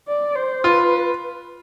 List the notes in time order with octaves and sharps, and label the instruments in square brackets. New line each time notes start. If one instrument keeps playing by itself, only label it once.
[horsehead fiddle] D5
C5
[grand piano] F4 [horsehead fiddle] B4